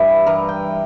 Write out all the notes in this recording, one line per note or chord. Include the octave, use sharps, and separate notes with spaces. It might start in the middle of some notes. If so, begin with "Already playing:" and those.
Already playing: G2 E3 G3 E5
G2 E3 G3 A#4
G5